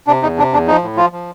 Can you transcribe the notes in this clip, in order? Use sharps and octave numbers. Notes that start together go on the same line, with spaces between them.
C3 D4
E2 D#4
C3 D4
E2 D4
F3 D#4
A2
F3 F4
F3